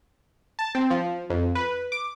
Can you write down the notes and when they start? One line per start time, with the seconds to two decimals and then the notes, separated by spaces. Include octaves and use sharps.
0.59 A5
0.75 C4
0.90 F3
1.30 F2
1.55 B4
1.92 D6